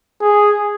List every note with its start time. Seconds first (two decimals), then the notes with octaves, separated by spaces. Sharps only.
0.21 G#4